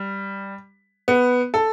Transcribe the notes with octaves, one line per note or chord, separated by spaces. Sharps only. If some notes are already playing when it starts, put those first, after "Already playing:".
Already playing: G3
B3
A4